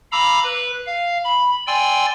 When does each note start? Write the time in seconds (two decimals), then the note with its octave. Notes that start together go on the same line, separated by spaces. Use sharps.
0.12 F5 A#5 B5 D6 E6
0.44 B4
0.86 F5
1.24 B5
1.67 D5 G5 G#5 C6 E6